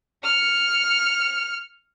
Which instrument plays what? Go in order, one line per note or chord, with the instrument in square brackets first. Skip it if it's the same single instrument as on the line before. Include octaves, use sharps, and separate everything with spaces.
[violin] F6 C#7